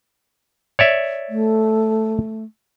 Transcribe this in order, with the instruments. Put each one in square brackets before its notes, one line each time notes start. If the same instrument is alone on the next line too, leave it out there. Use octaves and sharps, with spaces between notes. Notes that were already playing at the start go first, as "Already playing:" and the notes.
[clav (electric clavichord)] C#5 D5 E5
[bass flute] A3